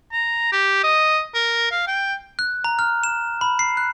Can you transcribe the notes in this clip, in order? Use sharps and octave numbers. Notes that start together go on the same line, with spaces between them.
A#5
G4
D#5
A#4
F5
G5
F#6
A#5
F6
E7
B5
C7
F#6